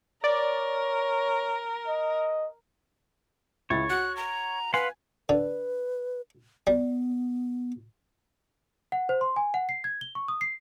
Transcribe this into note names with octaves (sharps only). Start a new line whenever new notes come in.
A#4 C#5 D5
D#5
C#2 E4 C#5 A6
F#4 F#6
A#5
B4 F5 F#5 G#5 C6
D3 B4
G3 B3
F#5
C5
C6
G#5
F#5
C7
G#6
G7
C#6
D#6
C7